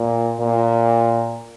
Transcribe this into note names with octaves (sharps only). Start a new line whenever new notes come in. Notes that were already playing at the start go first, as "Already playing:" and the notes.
Already playing: A#2
A#2